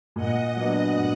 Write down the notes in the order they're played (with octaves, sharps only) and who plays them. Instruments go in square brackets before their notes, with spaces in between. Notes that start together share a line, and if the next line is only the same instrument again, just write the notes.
[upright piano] A#2 [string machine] D#5 F#5
[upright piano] F#3 B3 D4
A#2